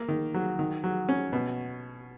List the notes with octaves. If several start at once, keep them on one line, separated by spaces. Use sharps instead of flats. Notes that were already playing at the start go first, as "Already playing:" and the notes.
Already playing: A#3
D#3
F#3
D#3
F#3
C#4
B2